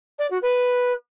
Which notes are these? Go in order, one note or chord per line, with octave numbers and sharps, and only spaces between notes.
D5
F#4
B4